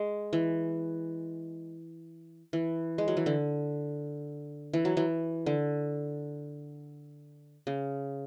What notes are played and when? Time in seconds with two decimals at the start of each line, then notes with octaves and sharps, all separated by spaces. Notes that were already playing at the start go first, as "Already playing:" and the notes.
Already playing: G#3
0.33 E3
2.53 E3
2.98 G#3
3.08 F#3
3.17 E3
3.26 D3
4.73 E3
4.85 F#3
4.97 E3
5.46 D3
7.67 C#3